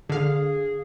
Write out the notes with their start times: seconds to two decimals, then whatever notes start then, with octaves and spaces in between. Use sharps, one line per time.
0.10 D3 G#4 F5